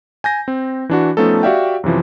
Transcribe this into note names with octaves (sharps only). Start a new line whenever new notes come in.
G#5 G6 A#6
C4
E3 D4 F#4
F3 A3 B3 C#4 D#4 A4
F#4 G4 D5 E5 F5 G5
F#2 C3 E3 F3